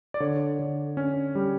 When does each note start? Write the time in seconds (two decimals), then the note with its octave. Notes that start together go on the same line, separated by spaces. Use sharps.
0.14 D5
0.20 D3 C#5
0.59 D3
0.97 C#4
1.35 G3